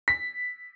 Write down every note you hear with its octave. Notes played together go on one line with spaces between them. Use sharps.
B6